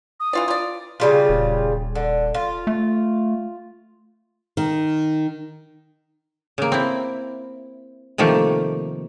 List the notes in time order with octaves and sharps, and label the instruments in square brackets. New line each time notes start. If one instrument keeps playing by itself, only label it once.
[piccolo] D#6
[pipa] E3 F4 D5
F4 D5
[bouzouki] C#3 G3 F4
[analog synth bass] D#1
[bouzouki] D3
F4
[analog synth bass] A3
[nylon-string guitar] D#3
[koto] C#3 A#3
C4 E4
C3 D#3 F3 A3 A#3